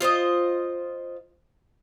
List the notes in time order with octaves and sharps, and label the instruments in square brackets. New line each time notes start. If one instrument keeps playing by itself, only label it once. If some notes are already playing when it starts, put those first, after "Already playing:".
[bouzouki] F4 C5 D5 D#5